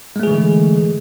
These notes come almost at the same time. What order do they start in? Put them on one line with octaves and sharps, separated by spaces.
G#3 A3 G#4 E3 D3